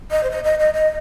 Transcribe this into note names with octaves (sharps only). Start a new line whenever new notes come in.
D#5
C5
D#5
D#5
D#5
D#5